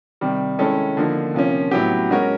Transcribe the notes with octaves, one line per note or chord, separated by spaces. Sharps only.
C3 D#3 G3
D#3 G#3 C#4 E4 A4
D3 F3 A#3 D#4
C3 F3 A#3 C#4
A2 F#3 B3 E4 G4
G#3 C#4 F#4 A#4 C#5